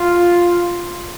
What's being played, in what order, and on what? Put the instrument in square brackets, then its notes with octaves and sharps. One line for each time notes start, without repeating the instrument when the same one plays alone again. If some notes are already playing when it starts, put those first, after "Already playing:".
Already playing: [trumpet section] F4